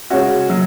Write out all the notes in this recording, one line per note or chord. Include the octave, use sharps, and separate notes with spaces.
C#3 G#3 C#4 F#4
F#3